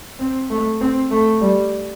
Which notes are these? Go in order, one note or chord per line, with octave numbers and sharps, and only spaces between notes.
C4
A3
C4
A3
G3